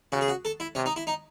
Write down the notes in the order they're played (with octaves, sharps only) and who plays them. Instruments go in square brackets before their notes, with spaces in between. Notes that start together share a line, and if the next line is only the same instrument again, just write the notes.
[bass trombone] C#3 [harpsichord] F#4
[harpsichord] G#4
F#4
A4
E4
[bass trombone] C3 [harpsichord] C#4
[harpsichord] D#4
E4
D#4